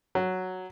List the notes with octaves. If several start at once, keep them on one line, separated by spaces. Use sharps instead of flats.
F#3